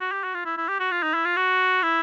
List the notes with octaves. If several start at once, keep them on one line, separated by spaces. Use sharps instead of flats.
F#4
G4
F#4
F4
E4
E4
G4
F#4
F4
D#4
E4
F4
F#4
E4